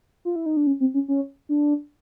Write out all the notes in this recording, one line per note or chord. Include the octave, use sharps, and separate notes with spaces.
F4
E4
D#4
D4
C#4
C4
C#4
C#4
D4